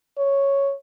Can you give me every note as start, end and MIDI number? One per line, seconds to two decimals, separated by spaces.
0.18 0.73 73